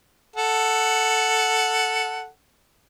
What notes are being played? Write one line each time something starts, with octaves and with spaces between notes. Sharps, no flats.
A4 F#5